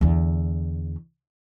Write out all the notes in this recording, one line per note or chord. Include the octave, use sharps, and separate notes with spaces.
E2 D3